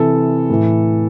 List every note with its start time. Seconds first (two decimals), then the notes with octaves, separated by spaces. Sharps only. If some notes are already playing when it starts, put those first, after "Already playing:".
Already playing: C3 E3 A4
0.50 A2 E3